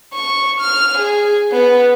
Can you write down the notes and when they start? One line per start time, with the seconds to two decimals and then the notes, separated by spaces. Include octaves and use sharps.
0.14 C#6
0.61 F6
0.98 G#4
1.51 B3